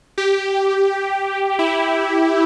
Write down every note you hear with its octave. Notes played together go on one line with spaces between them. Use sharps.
G4
E4
G4